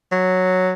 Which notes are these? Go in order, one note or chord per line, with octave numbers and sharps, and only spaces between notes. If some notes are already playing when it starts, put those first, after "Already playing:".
F#3